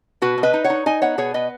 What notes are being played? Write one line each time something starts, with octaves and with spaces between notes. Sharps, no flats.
B2 F#4 B4
B2
B4 D#5
D#4
C#5 F#5
D#4
D#4 D#5 G#5
B3 C#5 F#5
B2 G#4 C#5
B3 B4 D#5